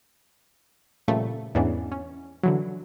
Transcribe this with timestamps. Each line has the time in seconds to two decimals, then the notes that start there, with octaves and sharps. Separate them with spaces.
1.08 A#2 C#3 F3 G3 A3
1.55 E2 G#2 E3 B3 C#4 D4
1.92 C#4
2.43 D3 E3 F#3